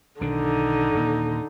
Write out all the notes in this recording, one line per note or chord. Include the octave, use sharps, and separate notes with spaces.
B1 D3 D#3 D4 D#4
D#1 A#2